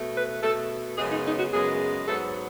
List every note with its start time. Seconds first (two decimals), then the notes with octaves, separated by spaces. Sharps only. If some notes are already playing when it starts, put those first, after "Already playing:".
Already playing: B2 A3
0.16 B4
0.42 B2 A3 A4
0.98 F#2 C#3 G#3 B3 G#4
1.11 D#4
1.25 D#4
1.38 F#4
1.53 F#2 C#3 G#3 B3 G#4
2.07 G#2 F#3 B3 A4